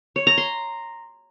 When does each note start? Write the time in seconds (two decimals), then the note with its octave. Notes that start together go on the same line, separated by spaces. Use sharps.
0.16 C#5
0.27 A#5
0.38 C6